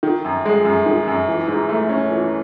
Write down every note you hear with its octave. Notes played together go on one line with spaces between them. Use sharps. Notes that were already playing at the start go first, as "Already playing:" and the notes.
D#3
F#2
G#3
F#2
D#3
F#2
E3
G#2
A3
C#4
E3